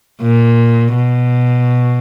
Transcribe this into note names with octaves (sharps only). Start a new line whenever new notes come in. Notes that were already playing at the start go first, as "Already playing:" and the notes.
A#2
B2